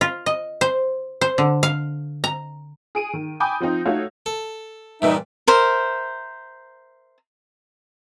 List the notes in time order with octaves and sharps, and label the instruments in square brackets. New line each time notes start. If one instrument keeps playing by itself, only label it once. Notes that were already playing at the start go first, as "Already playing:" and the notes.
[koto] F4
D#5
C5
C5
D3
F5
A#5
[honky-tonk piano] G#4 D7 D#7
D#3
G5 G#5 B5 D6 D#6 G6
F3 C4 D#4
A3 D#4 F#4 A4 C#5 F5
[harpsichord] A4
[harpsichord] G2 A#2 E3 [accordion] D#4 E5
[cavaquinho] A#4 C5 E5